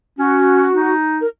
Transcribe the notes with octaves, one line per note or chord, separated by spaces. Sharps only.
C#4 F#4
D#4
A#4